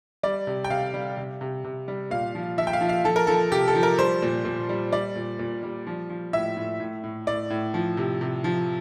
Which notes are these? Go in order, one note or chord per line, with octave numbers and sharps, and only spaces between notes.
G3 D5
C3
G5
C3 F5
G3
C3
C3
C3
G3
A#2 F5
F3
F3 E5
G5
F5
F3
F5
F3 A4
A#4
F3 A4
C3 G4
A4
F3
A#4
G3 C5
A#2
A#2
G3
G3 D5
A#2
A#2
G3
F3
F3
A2 E5
A2
A2
A2
A2 D5
A2
F3
C3
C3
F3